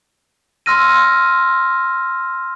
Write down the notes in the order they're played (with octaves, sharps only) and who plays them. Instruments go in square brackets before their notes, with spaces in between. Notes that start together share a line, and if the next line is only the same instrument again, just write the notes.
[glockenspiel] C6 E6 F6 A#6 D#7